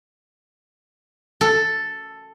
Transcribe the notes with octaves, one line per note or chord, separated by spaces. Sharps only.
A4